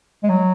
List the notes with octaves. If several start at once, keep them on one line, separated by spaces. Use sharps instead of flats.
G#3
F#3